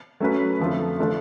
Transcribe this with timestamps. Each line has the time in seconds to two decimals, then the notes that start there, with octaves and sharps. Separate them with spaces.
0.20 F#3 A3 C#4 F#4 B4
0.59 F2 D3 F3 A3 F4
0.98 D3 F3 A3 D4 F4